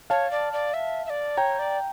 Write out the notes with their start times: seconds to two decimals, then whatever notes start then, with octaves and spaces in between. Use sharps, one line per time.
0.10 C#5 F5 A5
0.31 D5
0.53 D5
0.74 E5
1.06 E5
1.10 D5
1.37 C#5 G5 A#5
1.59 D5